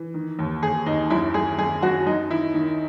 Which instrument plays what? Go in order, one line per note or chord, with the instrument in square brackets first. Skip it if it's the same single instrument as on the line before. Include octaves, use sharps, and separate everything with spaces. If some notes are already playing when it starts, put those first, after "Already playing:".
Already playing: [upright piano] E3
D#3
D#2
D#2 G#4
D#2 D#4
F#2 E4
F#2 G#4
F#2 G#4
F#2 F#4
F#2 D#4
D#3 E4
D#3